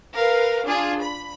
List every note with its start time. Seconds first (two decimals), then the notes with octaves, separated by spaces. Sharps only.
0.15 A#4 B4 F5
0.66 D4 F4 G#4
1.02 B5